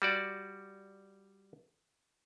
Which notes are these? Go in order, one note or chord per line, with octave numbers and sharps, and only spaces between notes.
G3 F#4 D5